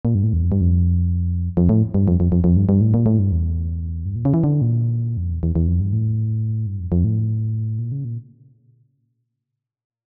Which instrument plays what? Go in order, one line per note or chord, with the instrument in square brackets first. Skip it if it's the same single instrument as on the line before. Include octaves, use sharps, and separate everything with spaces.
[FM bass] A#2
G2
A2
E2
F2
G2
F2
F2
A2
G2
F2
F2
F2
F2
G2
G2
A2
A#2
A2
G2
E2
G2
A#2
C#3
E3
D3
A#2
F2
E2
E2
E2
F2
G2
A2
G2
F2
F2
A2
A#2
C#3
A#2